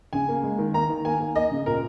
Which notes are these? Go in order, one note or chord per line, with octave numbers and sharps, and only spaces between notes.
C#3 G#5
A#3
G#3
D#3
A#3 A#5
D#3
A#3 G#5
A#3
A#3 D#5
C#3
A#2 A#4